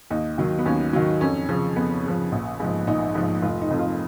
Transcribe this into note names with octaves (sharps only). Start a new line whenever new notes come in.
D#2 D#4
D#3 F#3
B3
D#2 C#4
D#3 F#3
F2 C#4
C#3 F3
F2 B3
C#3 F3
A#1
G#2 F3
A#1 D#4
G#2 F3
F1 F4
D#4
F2 F3
F4